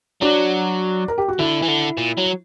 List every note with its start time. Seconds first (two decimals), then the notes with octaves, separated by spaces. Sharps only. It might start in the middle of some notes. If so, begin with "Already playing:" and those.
0.21 F#3 D4 F#4
1.08 A#4
1.18 G4
1.28 F#4
1.39 D3 E4
1.62 E3
1.68 D3
1.97 A#2
2.17 F#3